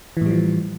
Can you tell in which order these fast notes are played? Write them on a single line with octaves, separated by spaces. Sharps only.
E3 A2 G3 F3